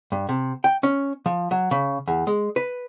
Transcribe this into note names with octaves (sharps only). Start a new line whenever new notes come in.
G2
C3
G5
C#4
F3
F#3
C#3
E2
G#3
B4